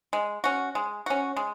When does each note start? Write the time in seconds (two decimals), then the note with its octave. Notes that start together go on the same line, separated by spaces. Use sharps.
0.13 G#3
0.44 C#4 F#4
0.75 G#3
1.06 C#4 F#4
1.37 G#3